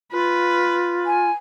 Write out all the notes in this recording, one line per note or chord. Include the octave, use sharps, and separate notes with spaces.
F4 B4
G#5